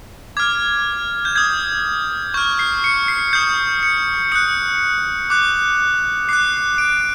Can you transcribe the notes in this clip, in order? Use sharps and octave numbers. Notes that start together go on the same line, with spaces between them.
D6 F6 G#6
G6
D#6 G6 G#6
C#6 F6 G6
C7
C#7
C7
D#6 G6
C#7
D#6 F#6 C#7
D6 F#6
D6 F#6 C7
D7